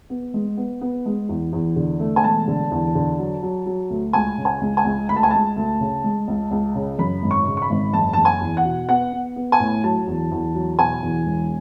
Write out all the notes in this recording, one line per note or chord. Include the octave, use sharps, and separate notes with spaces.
B3
G#3
B3
B3
G#3
E2
E2
D3
A3
G#5
E1 A5
D3
E2
D3
F#3
F#3
F#3
D2
C#2 G#5
C#3
G#5
C#2
G#5
C#2
D2 B5
A5
G#5
G#3 A5
D2
C#3
G#3
C#2
C#2
C#3
F#2 B5
G#1
C#6
C#3
C#6
B5
G#1
F#1 A5
F#1 A5
G#5
E2
F#5
B2
B3 F#5
B3
B3
G#5
A2
F#3 A5
E2
E2
F#3
B2 G#5
E2
E1